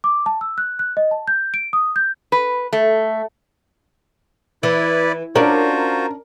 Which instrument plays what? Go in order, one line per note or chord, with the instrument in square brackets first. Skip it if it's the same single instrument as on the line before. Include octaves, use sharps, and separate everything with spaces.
[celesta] D6
A5
E6
F#6
F#6
D#5
A5
G6
D7
D#6
G6
[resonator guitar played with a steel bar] B4
A3
[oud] E3 [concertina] E4 B4 D5
[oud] C#4 D4 [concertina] F4 F#4 C5 [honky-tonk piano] A#4